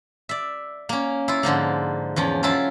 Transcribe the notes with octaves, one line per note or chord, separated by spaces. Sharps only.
D5 E5
A#3 C#4
E4 F4
G#2 D3 F3 A#3
E2 F3 C#4
F#3 C#4 E4 F4 A5